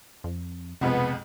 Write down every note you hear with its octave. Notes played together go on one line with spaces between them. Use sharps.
F2
B1 F2 C3 G#3 B3